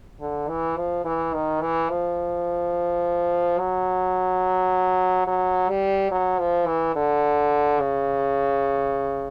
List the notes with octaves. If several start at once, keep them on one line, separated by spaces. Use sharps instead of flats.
D3
E3
F3
E3
D#3
E3
F3
F#3
F#3
G3
F#3
F3
E3
D3
C#3